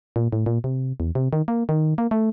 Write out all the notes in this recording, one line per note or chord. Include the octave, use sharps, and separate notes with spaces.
A#2
A2
A#2
C3
E2
C3
D#3
A#3
D#3
A#3
A3